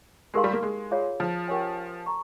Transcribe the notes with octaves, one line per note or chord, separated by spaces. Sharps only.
G#3 D#4 G4 A#4 F5 C6
G3
A#3
G#3
F4 G#4 C#5 F5
F3
C#4 G4 A#4 C#5 G#5
A#5 C#6